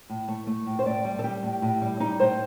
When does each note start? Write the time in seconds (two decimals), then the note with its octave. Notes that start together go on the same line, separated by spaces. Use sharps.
0.10 A2
0.28 A3
0.47 A3
0.67 A2
0.79 C5
0.86 A2 D5
1.05 G3
1.19 A4
1.23 G3 G4
1.43 A2
1.62 A2
1.82 G3
2.00 G3 D#4
2.20 A2 C5